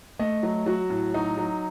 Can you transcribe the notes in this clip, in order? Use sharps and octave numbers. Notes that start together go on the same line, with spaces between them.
A3 D#5
F#3
F#3 F#4
A2
F#3 D#4
F#3